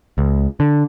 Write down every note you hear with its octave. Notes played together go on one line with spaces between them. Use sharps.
C#2
D3